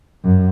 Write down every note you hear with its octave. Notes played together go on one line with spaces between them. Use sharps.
F#2